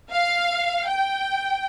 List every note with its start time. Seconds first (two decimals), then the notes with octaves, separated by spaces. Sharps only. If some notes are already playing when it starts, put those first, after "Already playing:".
0.11 F5
0.87 G5